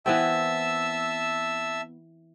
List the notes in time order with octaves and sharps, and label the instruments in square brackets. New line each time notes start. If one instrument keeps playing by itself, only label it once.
[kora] E3 B3 C4 [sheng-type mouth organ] E5 A5 E6